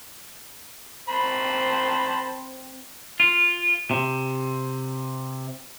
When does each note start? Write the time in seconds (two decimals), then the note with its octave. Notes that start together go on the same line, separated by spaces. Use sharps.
1.09 C4 C5 A5 B5
3.20 F4
3.91 C3